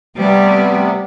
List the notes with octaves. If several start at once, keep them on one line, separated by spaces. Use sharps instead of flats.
C3 G3 A3 B3